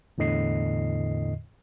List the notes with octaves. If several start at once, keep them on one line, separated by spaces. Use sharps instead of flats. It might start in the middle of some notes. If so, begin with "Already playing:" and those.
E2 A2 D3 D#5 C7